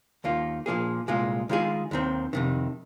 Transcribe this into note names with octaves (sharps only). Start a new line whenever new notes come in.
D#2 D#3 A#3 F4
A#2 F3 A#3 G#4
C2 A#2 G#3 F4
D#3 G#3 F4 G#4
D#2 D#3 C4
F2 C3 D#3